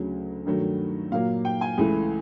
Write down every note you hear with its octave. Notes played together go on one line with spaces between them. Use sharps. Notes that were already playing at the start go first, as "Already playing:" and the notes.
Already playing: D2 C#3 F#3
G2 D#3 F#3 A3
A#2 F#3 A#3 F5
G5
G#5
C#2 C#3 E3 A3